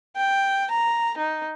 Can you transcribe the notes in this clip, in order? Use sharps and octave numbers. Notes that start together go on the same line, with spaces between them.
G5
A#5
D#4